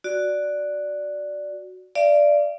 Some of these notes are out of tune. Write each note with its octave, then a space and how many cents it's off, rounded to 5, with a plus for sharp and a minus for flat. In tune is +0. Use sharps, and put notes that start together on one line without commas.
F#4 +0 D5 +0
D5 +0 F5 -45